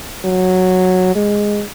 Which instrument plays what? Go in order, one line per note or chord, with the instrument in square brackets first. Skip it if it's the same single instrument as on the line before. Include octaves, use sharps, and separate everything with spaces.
[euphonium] F#3
G#3